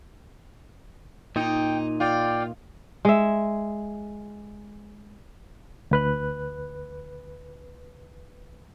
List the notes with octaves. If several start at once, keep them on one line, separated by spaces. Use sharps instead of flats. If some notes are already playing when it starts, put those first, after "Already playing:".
A#2 D#4 G5
F4 D5 G5
G#3 E5
D2 B4 F#6